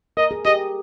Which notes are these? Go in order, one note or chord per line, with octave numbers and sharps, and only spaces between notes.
A#4 D#5
G#4
G4 D#5